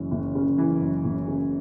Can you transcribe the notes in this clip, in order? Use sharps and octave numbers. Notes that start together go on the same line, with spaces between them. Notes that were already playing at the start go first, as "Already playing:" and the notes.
Already playing: F#1 F#2 E3
F#1
C#3
E3
F#2
F#1
C#3